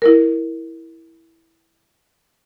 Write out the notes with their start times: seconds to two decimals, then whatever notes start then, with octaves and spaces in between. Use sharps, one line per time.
0.02 E4 A#4